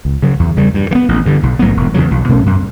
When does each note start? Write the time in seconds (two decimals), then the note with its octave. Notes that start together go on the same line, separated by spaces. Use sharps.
0.05 C#2
0.22 C#3 F#3
0.39 E2
0.57 C#3 G3
0.74 G2
0.91 E3
0.95 B3
1.09 A1
1.26 G2 D3
1.43 B1
1.59 A2 F#3 B3
1.77 E1
1.94 E2 C#3 F#3
2.11 B1
2.29 B2 A3 C#4
2.46 F#2